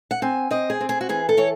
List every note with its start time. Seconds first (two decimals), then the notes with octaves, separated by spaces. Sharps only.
0.11 F#5
0.22 C4 G#5
0.51 C4 D#5
0.70 G#4
0.81 C4
0.89 G#4
1.01 F#4
1.09 E3 G#4
1.29 A4
1.37 E3 C#5